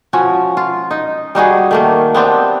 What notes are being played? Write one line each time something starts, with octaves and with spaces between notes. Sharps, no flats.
F3 C#4 F#4
F4
D#4
G3 D#4 F#4 G#4
D#3 A3 A#3
B3 C4 D4 G4